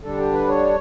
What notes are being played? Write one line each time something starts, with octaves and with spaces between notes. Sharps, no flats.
D3 G3 D4 A4
G4
B4
C#5